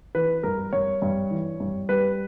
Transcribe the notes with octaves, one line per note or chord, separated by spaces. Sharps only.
E3 B4
G2 A#4
G2 C#5
G2
E3
G2
G3 B4